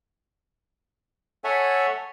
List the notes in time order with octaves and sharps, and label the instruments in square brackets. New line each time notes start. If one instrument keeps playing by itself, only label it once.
[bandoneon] A4 C#5 E5 F#5 G#5